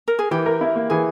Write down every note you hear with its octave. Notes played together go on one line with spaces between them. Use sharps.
A#4
G#4
E3 G4
A#4
E4
A#3
E3 G#4